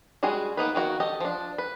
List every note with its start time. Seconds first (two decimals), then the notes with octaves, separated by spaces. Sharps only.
0.23 G3 G#3 F#4 G#4
0.57 A#3 B3 D#4 B4
0.75 D#3 A#3 F#4
1.00 G4 A4 D#5
1.20 F3 D4
1.58 B4